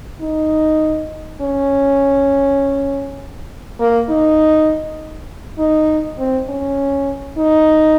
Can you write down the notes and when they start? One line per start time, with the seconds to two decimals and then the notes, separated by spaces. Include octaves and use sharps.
0.21 D#4
1.41 C#4
3.80 A#3
4.09 D#4
5.59 D#4
6.18 C4
6.49 C#4
7.38 D#4